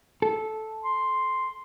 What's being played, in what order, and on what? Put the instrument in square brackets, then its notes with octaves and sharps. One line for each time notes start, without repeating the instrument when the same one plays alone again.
[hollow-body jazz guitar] A4
[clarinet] C6